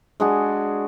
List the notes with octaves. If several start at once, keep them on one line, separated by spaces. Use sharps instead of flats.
G#3 D4 F#4 G#4